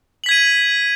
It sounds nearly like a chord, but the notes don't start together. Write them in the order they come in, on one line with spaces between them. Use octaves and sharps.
F#7 B6 G#6 D#7